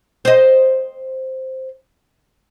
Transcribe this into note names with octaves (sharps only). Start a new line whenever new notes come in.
C5 D#5